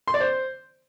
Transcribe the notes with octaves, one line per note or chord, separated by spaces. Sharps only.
C6
D5
C5